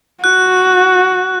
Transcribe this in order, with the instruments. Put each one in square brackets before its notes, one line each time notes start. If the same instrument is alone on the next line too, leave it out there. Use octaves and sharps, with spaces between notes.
[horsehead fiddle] F#4 [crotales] F#6